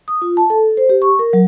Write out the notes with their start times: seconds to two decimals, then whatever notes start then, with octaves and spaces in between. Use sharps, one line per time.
0.08 D#6
0.22 F4
0.37 A5
0.50 A4
0.77 C5
0.89 G4
1.02 C#6
1.19 A#4
1.33 F#3